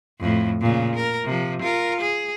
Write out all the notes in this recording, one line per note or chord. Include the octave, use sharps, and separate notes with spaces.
F2 A2
A#2 C#3
A#4
C3 F3
F4 A#4
G#4